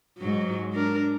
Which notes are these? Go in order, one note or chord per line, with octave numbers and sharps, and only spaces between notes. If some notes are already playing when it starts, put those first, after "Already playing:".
G#2 F#3
D4 A#4